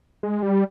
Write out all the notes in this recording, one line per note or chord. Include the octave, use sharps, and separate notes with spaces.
G#3
G3